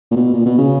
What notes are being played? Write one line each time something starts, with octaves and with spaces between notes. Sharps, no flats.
A#2
B2
A#2
B2
C#3